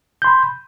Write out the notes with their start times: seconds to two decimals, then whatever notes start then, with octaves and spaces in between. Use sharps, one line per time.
0.22 G6
0.24 C6
0.27 B5